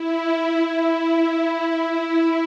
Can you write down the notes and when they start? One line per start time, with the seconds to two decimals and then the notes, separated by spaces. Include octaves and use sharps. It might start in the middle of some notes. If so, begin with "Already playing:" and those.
Already playing: E4
0.55 E4